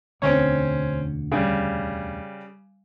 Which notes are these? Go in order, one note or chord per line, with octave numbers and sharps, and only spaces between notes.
E1 D2 D3 C4 C#4 C#5
C#3 G3